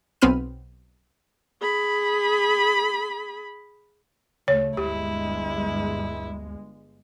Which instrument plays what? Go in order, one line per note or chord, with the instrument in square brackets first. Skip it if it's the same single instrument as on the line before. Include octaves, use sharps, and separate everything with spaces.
[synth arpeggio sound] B1 B3 C4 B5 F6 D#7
[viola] G#4 B5
[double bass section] D2 A3 [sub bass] C#3 [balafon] C#5
[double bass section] G1 G2 G#3 [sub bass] D2 [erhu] E4 [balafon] G4